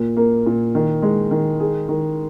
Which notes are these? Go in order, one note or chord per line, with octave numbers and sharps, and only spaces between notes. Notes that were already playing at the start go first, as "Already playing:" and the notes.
Already playing: A#2
A#3
A#2
D#3
G#3
D#3
G#4
D#3